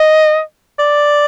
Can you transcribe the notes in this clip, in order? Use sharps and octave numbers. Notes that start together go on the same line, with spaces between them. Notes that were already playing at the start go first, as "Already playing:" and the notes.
Already playing: D#5
D5